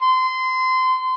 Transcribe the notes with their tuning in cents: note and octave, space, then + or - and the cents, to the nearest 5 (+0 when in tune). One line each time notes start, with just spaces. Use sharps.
C6 -25